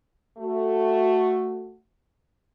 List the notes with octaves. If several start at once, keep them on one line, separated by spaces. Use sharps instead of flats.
A3 F#4